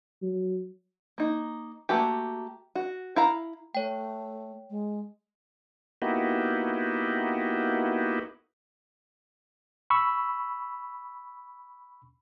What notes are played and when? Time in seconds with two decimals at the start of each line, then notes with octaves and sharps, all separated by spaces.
0.22 F#3
1.18 A#3 D#4
1.89 A3 A#3 F#4 G4
2.75 F#4
3.16 E4 F5 A#5
3.75 A3 C#5 G5
4.70 G#3
6.02 A#3 B3 D#4 E4 F#4 G4
9.90 B5 C#6 E6